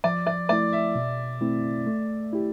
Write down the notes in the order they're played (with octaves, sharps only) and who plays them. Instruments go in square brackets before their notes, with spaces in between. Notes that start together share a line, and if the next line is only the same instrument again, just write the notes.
[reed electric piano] F3 [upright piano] D5
[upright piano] D5
[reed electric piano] A3 E4 [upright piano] D5
[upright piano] E5
[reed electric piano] B2
A3 C4 E4
A3
E4 G4